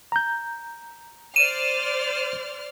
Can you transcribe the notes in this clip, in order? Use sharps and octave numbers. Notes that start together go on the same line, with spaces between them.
A#5 G6
C5 D5 F6 D#7 E7